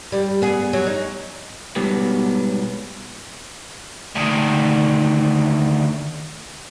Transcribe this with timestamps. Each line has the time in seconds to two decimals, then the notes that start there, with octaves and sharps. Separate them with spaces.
0.12 G3
0.42 B3 G#4
0.73 F#3
0.87 D#4
1.76 G#2 B2 F#3 G3 B3
4.15 D2 D#3